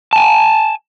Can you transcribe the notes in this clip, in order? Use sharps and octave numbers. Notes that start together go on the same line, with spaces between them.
G#5 A5